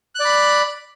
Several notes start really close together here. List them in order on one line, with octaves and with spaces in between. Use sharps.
F#6 D5 B5